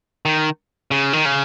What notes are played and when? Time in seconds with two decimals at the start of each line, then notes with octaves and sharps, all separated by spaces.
0.25 D#3
0.91 C#3
1.13 D#3
1.25 C#3